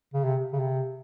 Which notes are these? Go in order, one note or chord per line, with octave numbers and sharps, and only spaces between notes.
C#3
C3
C#3
C3